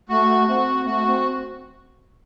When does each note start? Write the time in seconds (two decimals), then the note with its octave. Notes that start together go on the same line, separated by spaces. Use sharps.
0.08 A3 F#4
0.47 C4 F#4
0.86 A3 F#4
1.06 C4